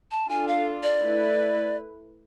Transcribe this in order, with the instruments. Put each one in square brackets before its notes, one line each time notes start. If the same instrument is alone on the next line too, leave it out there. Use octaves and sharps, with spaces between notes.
[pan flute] A5
[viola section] D4 F4 A4 [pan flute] G#5
[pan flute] F5
D5
[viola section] A3 E4 B4